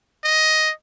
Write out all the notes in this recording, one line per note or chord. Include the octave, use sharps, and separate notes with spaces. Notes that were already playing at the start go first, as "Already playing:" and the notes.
D#5